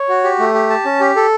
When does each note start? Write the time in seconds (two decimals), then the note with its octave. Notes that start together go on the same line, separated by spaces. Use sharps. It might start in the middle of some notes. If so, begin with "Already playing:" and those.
Already playing: C#5
0.09 F#4
0.24 G4
0.40 A3
0.54 G4
0.70 A5
0.85 C#4
1.00 G4
1.16 A4